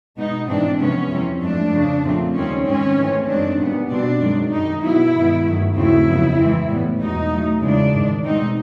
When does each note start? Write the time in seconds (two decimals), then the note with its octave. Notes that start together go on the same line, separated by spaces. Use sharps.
0.17 B2 G#3 B3 D#4
0.48 G#2 E3 G#3 C4 D4
0.79 C3 F3 G#3 B3 C#4
1.10 F2 C3 E3 G3 C4
1.41 G#2 F3 A3 D4
1.72 F2 C#3 F3 G#3
2.03 A#2 F3 A3 C4
2.34 D#2 D#3 G3 C4 C#4
2.65 G#2 D#3 G#3 C4 C#4
2.96 G#2 E3 A3 C4
3.27 F#2 D#3 G#3 C4 D4
3.59 A#2 G3 B3
3.89 B2 G3 C4 D4
4.21 F#2 D#3 G#3
4.51 F#2 D#3 G3 D#4
4.82 B2 F#3 B3 E4
5.14 G2 D#3 G#3 B3
5.45 G2 D#3 F#3 A3
5.75 D#2 C#3 F#3 A3 C4 E4
6.07 F2 C#3 F#3 B3
6.38 G#2 E3 G#3 C4
6.69 A2 E3 G3 B3
7.00 E2 B2 G#3 D#4
7.30 A2 F#3 A3
7.61 E2 C#3 E3 G#3 D4
7.93 G#2 D#3 G#3
8.24 B2 G#3 C4 D#4